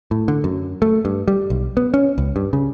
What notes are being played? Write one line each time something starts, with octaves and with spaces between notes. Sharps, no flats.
A2
D3
F#2
A3
G2
G3
B1
B3
C#4
C#2
G2
C#3